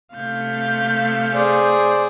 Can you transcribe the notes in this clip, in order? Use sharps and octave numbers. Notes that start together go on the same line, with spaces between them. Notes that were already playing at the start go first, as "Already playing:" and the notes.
C3 A3 F5 G6
G#4 C5 D5